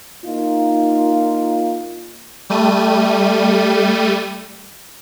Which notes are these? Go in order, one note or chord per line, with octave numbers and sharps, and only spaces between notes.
A#3 D#4 F4
G3 A3 D#7